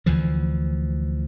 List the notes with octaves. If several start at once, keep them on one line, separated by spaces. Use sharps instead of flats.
D2 E3 F3